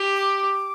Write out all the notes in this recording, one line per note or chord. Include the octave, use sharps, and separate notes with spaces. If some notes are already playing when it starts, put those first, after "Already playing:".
Already playing: G4
D6